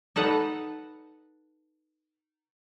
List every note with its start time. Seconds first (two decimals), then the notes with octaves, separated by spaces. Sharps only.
0.16 D#4 A4 B4 F#5